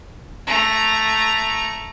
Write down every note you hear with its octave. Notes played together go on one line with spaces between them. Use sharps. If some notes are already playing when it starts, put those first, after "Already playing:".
A3 A#5